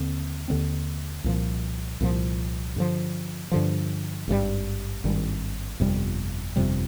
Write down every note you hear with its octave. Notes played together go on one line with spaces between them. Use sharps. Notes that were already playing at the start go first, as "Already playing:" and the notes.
Already playing: D#2 D3 C4
D#2 D3 G3 C4
C2 A#2 F3
C2 A#2 F3
G2 D3 F3
G2 D3 F3
G#1 G2 D#3 G3
G#1 G2 D#3 G3
G1 F2 C3 G3
G1 F2 C3 G3